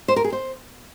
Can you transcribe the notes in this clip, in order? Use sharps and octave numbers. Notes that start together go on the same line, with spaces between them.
C5
A#4
G#4
C5